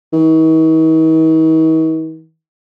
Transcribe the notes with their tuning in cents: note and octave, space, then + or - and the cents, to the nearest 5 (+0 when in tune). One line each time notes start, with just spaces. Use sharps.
D#3 +45